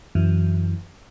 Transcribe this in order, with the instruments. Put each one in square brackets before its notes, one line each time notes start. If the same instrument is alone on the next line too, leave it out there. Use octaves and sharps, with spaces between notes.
[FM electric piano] F#2 E3